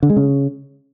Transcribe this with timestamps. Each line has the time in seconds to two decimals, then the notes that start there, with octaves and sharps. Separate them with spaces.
0.03 D3
0.10 G#3
0.16 C#3